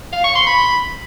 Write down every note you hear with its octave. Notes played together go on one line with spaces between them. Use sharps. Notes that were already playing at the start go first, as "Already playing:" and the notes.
F5
C#6
C6
B5